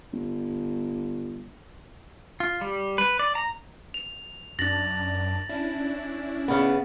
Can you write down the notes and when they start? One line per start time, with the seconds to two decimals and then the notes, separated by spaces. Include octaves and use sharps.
0.13 G1
2.40 F4
2.61 G3
2.98 B4
3.19 D5
3.35 A#5
3.94 F7
4.59 F#2 D4 A6 A#6 F#7
5.49 C#4 D4 E4
6.48 C#3 B3